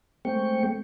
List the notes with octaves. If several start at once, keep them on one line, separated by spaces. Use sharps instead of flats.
G#3 A3 C4 G5 C#6